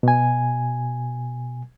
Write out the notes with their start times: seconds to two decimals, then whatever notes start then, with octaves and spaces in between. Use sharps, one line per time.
0.03 B2 G#5